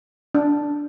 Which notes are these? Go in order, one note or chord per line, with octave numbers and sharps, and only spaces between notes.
D4